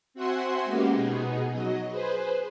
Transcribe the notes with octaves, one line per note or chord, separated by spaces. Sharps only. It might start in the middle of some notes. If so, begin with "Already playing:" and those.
C4 F#4 E5 F#5 G#5 C6
G#3 A#3 B3 C#4 F#4 G4
B2 B3 D#4 G#4
F#3 D#5
G#4 B4 C5